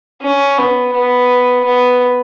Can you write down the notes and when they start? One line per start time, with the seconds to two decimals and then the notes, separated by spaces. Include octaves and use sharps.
0.23 C#4
0.58 B3
0.94 B3
1.65 B3